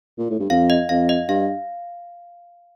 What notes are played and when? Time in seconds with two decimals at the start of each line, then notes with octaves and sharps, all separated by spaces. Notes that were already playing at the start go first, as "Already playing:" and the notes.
0.19 A#2
0.30 A2
0.40 G2
0.50 F2 F5
0.70 D#5
0.89 F2 F5
1.09 D#5
1.29 G2 F5